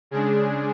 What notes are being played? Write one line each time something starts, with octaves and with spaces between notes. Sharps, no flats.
C#3 G#3 D4 G#4